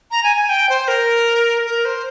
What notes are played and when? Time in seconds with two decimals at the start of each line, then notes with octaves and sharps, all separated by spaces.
0.11 A#5
0.24 G#5
0.36 G#5
0.49 G5
0.69 C5
0.88 A#4
1.66 A#4
1.85 C5